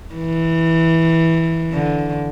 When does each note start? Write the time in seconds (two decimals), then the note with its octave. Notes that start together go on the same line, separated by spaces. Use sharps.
0.14 E3
1.73 D3